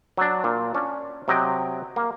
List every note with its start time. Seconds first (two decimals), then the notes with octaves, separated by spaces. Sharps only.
0.17 F#3 D4
0.44 A#2
0.75 C#4 D4
1.28 C3 F#3 D#5 G5
1.96 A#3